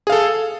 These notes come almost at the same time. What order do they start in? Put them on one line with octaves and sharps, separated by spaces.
G#4 F5 A4